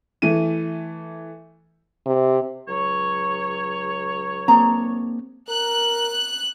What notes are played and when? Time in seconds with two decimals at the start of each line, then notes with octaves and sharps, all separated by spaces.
0.22 E3 A3 D#7
2.06 C3
2.68 C#2 F#3 C#5
4.48 A#3 C4 D4 G#4 A#5
5.49 A#4 F#6